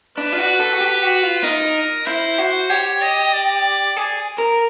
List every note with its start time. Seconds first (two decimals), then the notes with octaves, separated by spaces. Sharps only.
0.18 D4 B4
0.32 F4
0.38 F#4
0.60 A4
0.73 F#4
0.81 G4
1.02 F#4
1.23 F4
1.43 D#4 A#4
2.07 E4 C5
2.38 F#4
2.70 G4 C#5
3.02 D#5
3.34 D5
3.97 G#4
4.38 A#4